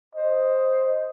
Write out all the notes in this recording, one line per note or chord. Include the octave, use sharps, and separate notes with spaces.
C5 D#5